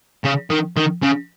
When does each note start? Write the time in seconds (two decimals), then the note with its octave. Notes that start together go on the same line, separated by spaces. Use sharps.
0.25 C#3
0.50 D#3
0.77 D#3
1.02 C#3